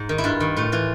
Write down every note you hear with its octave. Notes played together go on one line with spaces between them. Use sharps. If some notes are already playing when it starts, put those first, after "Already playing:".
Already playing: G#2
D#3
E4
G2 F4
D#3
A2 F4
E3 F4